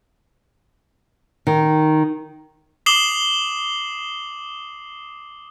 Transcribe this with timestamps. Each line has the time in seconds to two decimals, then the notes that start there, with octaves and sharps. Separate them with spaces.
1.47 D#3
2.86 D6 D#6 C7 E7 F#7 G7